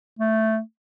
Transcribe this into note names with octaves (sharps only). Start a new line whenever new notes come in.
A3